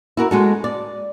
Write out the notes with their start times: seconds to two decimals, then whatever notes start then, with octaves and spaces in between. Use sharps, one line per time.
0.17 E4 F#4 A#4
0.31 G#3 F#4 A4
0.64 D5